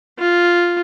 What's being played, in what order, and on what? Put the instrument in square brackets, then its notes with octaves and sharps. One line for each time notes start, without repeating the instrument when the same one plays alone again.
[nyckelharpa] F4